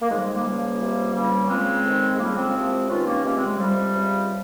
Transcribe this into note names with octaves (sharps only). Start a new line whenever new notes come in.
A#3
F2 D#3 G#3
G3
G#3
G3 A#3
C#2 C#3 F3
C#2 C3 F3
C#2 C#3 F3 G3 A#3
C#4
C#2 C#3 F3 G#3 C4
F2 D#3
G#3
F2 C#3 F3 G3 A#3
G#3 C4
C2 C3 F3
G2 D#3 C#4 F4
A#3 C#4
C#2 C3 D#3 A#3 C#4
G#3 C4
G#3
F2 C3 F3 G3
C#2 C3 F3